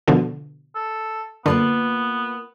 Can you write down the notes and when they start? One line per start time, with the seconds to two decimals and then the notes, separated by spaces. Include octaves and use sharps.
0.08 B2 D3 F3
0.75 A4
1.46 D3 A#3 B3 F4 B4